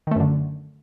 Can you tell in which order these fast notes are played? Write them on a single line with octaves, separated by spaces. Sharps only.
D#3 A3 F#2 D3